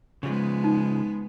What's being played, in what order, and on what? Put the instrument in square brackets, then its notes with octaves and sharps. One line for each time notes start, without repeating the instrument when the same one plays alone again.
[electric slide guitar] C#3 F3 [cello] G#3 B3
[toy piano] D#4